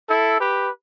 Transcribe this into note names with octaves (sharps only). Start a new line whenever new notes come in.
E4 A4
G4 B4